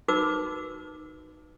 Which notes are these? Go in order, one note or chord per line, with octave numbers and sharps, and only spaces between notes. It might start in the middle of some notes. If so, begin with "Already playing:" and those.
D#4 F#4 A#4 B4 D6 E6